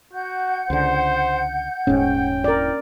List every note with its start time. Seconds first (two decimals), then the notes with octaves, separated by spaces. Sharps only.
0.13 F#4 F#5 G6
0.70 C#2 D3 C5
1.87 D#1 G#2 C#4 G5
2.44 E4 A#4 D5